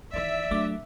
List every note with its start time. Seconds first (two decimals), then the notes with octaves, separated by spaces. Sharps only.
0.14 D#3 E3 D5 E5
0.51 F#3 A3 D4 D6